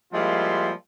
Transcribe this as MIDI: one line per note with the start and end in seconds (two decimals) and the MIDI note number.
0.13 0.71 53
0.13 0.71 55
0.13 0.71 56
0.13 0.71 58
0.13 0.71 64
0.13 0.71 65